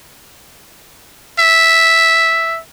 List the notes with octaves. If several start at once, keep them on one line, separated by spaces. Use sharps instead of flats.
E5